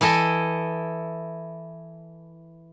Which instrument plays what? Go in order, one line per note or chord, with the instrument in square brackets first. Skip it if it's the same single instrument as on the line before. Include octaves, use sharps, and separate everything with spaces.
[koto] E3 E4 A4 D#5